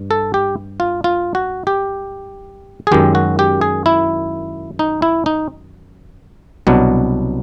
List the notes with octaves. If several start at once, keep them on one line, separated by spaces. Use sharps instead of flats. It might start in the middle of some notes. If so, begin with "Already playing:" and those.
Already playing: G2
A4
G4
F4
F4
F#4
G4
G#4
F#2 D#3 G#3 G4
F#4
G4
G#4
E4
D#4
E4
D#4
C2 B2 F#3 B3 D4